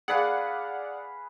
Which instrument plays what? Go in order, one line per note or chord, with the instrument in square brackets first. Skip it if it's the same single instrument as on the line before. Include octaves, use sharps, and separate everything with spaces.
[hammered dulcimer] G#4 B4 F5 [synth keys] D5 F#5